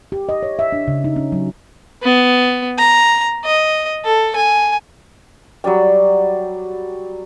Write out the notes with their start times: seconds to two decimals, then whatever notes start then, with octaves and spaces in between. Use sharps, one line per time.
0.12 G4
0.29 D#5
0.43 C#5
0.59 E5
0.72 D4
0.88 C#3
1.04 D#4
1.16 C#4
1.32 F#3
2.02 B3
2.78 A#5
3.44 D#5
4.04 A4
4.35 G#5
5.64 F#3 G3 D5 G5